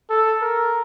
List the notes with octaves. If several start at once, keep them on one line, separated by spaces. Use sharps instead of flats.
A4
A#4